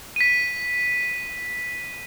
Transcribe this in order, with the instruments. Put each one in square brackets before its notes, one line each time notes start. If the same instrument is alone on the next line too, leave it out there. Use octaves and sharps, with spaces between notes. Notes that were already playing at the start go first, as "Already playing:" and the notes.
[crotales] B6 D#7